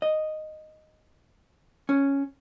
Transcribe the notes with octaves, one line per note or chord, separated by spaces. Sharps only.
D#5
C#4